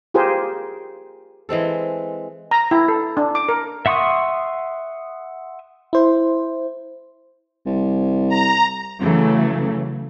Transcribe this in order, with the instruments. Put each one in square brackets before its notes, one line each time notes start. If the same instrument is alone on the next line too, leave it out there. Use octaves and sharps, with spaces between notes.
[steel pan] F4 G4 G#4 A#4 C5
[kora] E3 G#3 C4 A4
[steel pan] A#5
E4
A4
D4
D6
A#4
[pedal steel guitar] E5 F#5 C6 C#6 D#6
[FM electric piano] E4 C5
[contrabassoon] C2
[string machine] A#5
[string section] C#3 E3 F#3 A3